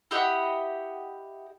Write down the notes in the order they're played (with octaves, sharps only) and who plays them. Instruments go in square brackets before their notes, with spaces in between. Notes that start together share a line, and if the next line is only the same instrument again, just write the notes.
[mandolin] E4 G4 D#5 F#5